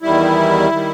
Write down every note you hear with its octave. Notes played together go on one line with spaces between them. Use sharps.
E2 D#3 G3 E4
D#3 G3